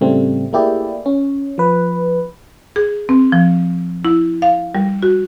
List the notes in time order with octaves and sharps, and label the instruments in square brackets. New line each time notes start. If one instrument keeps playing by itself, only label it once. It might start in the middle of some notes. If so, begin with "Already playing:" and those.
[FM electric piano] A2 C#3 G3 A3 C4
A3 A#3 E4 G4 G#4 D5
C#4
F3 B4
[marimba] G#4
C4
F3
E4
F5
G3
F#4